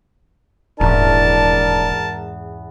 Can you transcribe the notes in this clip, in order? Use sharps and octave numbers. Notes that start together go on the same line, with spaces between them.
D#1 E2 G#2 C#4 D4 A#4 A5